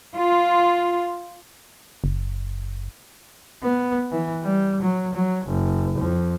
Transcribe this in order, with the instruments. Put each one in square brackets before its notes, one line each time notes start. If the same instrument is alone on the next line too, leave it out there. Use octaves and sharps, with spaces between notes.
[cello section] F4
[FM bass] F#1
[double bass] B3
E3
G3
F#3
F#3
F#1
F2